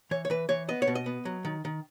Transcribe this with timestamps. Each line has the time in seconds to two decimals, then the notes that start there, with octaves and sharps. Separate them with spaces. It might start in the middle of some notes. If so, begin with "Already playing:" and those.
0.11 E3 C#5
0.25 C#5
0.30 E3 B4
0.49 E3 C#5
0.68 B3 D#5
0.82 C#5
0.87 B2
0.95 D#5
1.06 B3
1.25 F#3
1.45 D#3
1.65 D#3